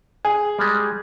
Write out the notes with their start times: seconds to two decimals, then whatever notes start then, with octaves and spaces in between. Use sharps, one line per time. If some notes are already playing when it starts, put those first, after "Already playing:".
0.25 G#4
0.58 G3 G#3